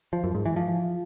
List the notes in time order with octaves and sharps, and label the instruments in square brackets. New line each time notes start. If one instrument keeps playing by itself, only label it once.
[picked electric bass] F3
F#2
G#2
E3
F3